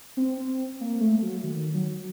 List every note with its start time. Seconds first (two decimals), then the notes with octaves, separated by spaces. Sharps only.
0.17 C4
0.81 A#3
1.00 A3
1.22 F#3
1.43 D#3
1.74 F#3